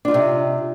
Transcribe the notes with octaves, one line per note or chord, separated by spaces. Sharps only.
C3 D4 D#4 F4